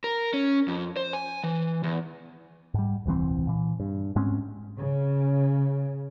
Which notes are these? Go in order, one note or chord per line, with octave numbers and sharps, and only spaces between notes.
A#4
C#4
F2
C5
G#5
E3
E2
G#2 G3
D#1 C2 E3 C4
A#2 E3
G2
G#2 G#3 C4 C#4
C#3